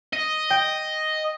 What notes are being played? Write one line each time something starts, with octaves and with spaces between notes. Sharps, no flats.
D#5
G5